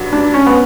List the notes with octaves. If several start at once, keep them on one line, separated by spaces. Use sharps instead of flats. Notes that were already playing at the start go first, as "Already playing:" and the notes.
Already playing: G2 F#3
D4
C#4
B3